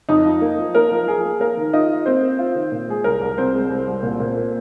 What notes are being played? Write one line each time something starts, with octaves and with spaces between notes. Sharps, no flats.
F2 D#4 D#5
F3
A#3
F3
A#3 A#4
F3
F3 G#4
A#3
A#3 A#4
D#3
D#4 F4 D#5
F4
A#3 C4 C5
A#3
F4
D#3
A#2
G#3 G#4
C2 A#4
C2
C2 C4 C5
G#3
C2
C2
A#2
A#2
A#3